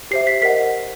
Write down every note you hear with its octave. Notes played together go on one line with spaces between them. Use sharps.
G4 C5 E5 C7
B6
A#4 D#5 F#5 B6